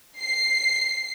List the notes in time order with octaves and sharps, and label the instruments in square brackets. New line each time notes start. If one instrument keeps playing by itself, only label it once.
[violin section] C7